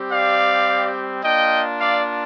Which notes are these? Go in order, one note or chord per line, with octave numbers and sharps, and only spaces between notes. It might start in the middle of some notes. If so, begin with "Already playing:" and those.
Already playing: G3 C4 G4
D5 F5
A#3 D4 F4 D#5 G5
D5 F5